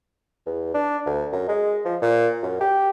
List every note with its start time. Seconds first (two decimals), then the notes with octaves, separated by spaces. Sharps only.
0.46 E2
0.74 D4
1.06 D2
1.32 F#2
1.48 G#3
1.85 F3
2.02 A#2
2.42 F#2
2.61 G4